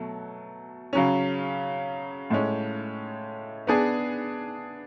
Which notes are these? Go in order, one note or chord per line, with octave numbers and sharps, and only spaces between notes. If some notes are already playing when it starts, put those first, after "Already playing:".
Already playing: B2 F#3 A3
C#3 F#3 C#4
A2 G#3 C#4
B3 D4 G#4